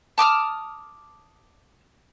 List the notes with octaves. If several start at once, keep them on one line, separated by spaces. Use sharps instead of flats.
A5 D6 D#6 F6